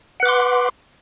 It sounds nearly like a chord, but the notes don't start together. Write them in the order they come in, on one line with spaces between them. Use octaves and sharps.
F#5 B4 D6 C6